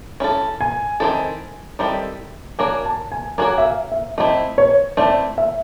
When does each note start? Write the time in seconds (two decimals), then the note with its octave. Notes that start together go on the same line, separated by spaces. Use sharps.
0.20 C#4 E4 A4
0.61 G#5
1.00 D#3 G3 C4 E4 A4
1.79 D#3 G3 C4 E4 A4
2.59 A#3 D4 F#4 A#4 C#5 G#5
2.85 A5
3.12 G#5
3.38 A#3 D4 F#4 A#4 C#5 G#5
3.58 E5
3.65 F5
3.92 E5
4.18 A3 C4 E4 D#5
4.58 C#5
4.97 A3 C4 E4 D5
5.38 E5